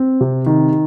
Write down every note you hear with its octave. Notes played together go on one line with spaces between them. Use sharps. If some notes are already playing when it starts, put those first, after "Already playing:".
Already playing: C4
C3
D#3